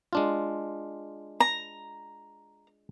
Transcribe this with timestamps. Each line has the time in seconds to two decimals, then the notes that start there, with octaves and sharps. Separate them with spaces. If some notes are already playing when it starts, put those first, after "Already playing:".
0.13 G#3 D4 F4
1.40 A#5